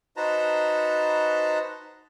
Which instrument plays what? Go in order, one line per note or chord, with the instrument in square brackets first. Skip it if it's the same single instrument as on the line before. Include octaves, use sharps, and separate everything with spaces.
[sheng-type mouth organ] D#4 F#4 B4 C5 A5 A#5